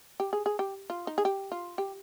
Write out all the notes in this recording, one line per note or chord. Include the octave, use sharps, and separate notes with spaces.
G4
G#4
G#4
G4
F4
D#4
G#4
G4
F4
G4